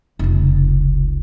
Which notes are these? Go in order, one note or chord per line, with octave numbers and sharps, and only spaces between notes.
F1 C#2